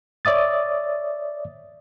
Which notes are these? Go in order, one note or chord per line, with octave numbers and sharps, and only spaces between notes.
C#5 D5 E5 D#6 A6